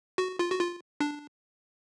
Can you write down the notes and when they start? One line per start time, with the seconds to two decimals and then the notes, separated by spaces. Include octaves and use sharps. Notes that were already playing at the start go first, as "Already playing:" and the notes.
0.18 F#4
0.39 F4
0.51 F#4
0.60 F4
1.00 D4